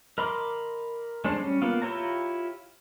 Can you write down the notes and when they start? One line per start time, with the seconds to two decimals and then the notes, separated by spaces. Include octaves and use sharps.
0.18 A#4 D#5 B5 C6 D6
1.25 G#3 A3 D4 C5
1.39 G3 C#4
1.62 A#3 B3 F4
1.82 E4 F4 G4 C#5 A#5